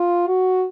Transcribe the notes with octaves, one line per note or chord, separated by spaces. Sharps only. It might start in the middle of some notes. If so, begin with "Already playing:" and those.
Already playing: F4
F#4